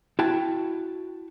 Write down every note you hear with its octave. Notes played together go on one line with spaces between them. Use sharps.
E4 F#4 G5 A5